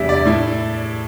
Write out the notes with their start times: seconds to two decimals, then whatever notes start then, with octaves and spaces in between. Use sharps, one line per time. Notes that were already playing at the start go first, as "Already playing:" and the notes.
Already playing: E2 C3 G3 D4 E5
0.09 D5
0.25 A2 A3 E4